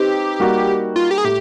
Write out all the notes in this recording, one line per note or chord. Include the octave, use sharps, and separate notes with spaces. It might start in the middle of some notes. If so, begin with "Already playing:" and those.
Already playing: C4 D#4 G4 B4
G3 A#3 D#4 F#4
F4
G4
G#4
A2 G4